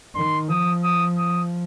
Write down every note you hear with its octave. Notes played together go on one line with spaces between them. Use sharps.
D#3 C6
F3 D#6
D#6
D#6